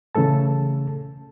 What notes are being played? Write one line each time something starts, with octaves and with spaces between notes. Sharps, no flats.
C#3 E3 A3 A4 A5